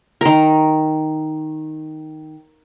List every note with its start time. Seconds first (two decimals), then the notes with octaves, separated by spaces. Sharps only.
0.21 D#3 A#4